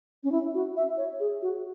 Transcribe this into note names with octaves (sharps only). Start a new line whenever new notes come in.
C#4
E4
F#4
E5
C#5
G#4
F#4